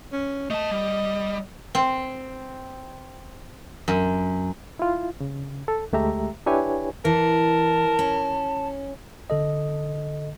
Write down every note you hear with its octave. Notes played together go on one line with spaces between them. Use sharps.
C#4
A3 D#5 A5
G3
C4
F#2
E4 F4
C#3
A4
D2 G#3 A3 G4 E5 A#5
D4 E4 G4 B4 C#5 G#5
E3 A#4 A5
C#4
D3 A4 D#5